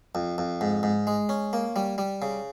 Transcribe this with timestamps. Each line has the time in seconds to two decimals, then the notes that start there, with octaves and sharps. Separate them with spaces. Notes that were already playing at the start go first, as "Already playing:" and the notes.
0.15 F2
0.38 F2
0.61 G#2
0.83 G#2
1.07 G#3
1.29 C#4
1.53 A#3
1.76 G3
1.98 G3
2.22 C#3